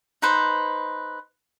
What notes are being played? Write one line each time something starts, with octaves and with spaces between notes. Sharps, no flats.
D#4 B4 C5